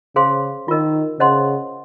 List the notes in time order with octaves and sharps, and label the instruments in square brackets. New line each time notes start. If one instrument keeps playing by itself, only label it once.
[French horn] C#3 [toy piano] G#4 C5 F5 C6
[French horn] D#3 [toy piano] F4 A#4 D#5
[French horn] C#3 [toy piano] C5 D#5 F#5 C6